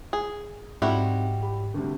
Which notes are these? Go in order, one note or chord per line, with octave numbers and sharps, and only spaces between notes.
G#4
G#2 G3 C4 D#4 E4 F#4
G4 B5
D2 G2 C3